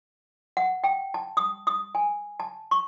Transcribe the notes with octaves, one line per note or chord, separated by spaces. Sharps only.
F#5
G5
A5
D#6
D#6
G#5
A5
C#6